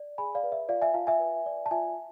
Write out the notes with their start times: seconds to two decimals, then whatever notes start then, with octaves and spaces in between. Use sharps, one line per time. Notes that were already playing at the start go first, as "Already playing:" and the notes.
Already playing: D5
0.18 G#4 G#5 B5
0.35 D5 F5
0.43 B4
0.52 E5
0.69 F4 D5 F5
0.81 E5 G#5
0.94 F4 F5 A5
1.07 E5 G#5
1.20 B4
1.46 D5
1.66 A5
1.71 F4 E5 G#5